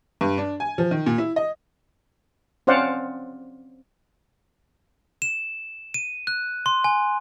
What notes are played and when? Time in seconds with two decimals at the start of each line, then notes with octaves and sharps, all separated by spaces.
0.21 G2
0.38 D4
0.60 G#5
0.78 F3
0.91 D#3
1.06 A#2
1.18 E4
1.36 D#5
2.67 C4 C#4 C5 D5 F5 F#5
5.22 E7
5.94 D#7
6.27 F#6
6.66 C6
6.84 G#5